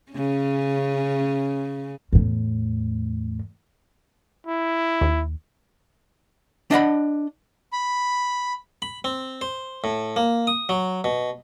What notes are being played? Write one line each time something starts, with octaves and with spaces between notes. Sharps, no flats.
C#3 C#4
E2 A2
E4
D#2
D4 D#5 F#5 B5
B5
B5
C4
C5
A2
A#3
D#6
F#3
B2